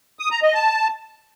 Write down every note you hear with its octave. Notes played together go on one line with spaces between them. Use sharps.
D#6
A#5
D#5
A5